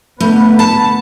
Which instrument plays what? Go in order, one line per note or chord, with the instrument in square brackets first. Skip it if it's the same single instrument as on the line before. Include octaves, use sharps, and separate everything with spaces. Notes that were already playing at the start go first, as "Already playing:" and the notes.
[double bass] D3 B3 [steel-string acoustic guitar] A3 [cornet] B4
[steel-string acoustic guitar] A5 [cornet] B5